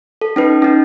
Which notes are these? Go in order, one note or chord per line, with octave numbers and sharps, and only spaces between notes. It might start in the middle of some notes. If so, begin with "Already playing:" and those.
A4
C#4 D#4 B4
C#4 D#4